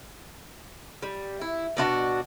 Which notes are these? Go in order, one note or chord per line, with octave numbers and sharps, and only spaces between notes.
G3
E4
B2 D4 F4 F#4